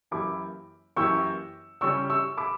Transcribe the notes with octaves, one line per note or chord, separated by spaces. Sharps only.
F#2 E3 A#3 E4 G4 B5 D6
F#2 E3 A#3 E4 G4 C#6 E6
C#3 G3 C#4 G4 C#6 E6
C#6 E6
B5 D6